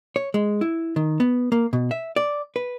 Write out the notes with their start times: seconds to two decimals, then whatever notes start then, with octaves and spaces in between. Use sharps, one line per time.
0.16 C#5
0.34 G#3
0.61 E4
0.96 D#3
1.20 B3
1.52 A#3
1.73 B2
1.91 E5
2.16 D5
2.56 B4